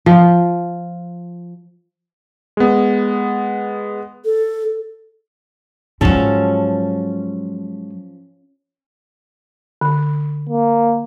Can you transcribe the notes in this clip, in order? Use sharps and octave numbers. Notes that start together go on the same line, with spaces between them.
F3
G#3 B3
A4
G#2 F3 F#3 C#4 A4
D3
A#3